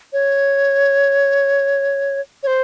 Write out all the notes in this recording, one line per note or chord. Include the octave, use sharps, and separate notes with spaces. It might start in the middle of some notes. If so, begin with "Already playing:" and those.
C#5
C#5
C5